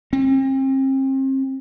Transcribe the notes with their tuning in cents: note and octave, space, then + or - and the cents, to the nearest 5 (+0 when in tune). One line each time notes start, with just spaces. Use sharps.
C4 +40